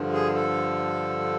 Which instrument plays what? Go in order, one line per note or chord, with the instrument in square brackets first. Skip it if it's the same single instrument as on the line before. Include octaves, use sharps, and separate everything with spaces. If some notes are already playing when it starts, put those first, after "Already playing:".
Already playing: [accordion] G2 D3 F3
G#4
A4